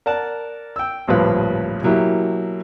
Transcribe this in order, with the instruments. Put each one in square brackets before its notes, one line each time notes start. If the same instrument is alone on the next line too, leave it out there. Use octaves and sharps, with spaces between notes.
[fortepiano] A#4 D5 F#5 A5
G5 E6
A1 D2 G2 A#2 F3 B4
B2 E3 F#3 A#3 E4 G4